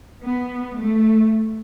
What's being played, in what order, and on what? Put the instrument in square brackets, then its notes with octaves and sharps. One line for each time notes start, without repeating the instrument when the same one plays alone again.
[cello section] B3
A3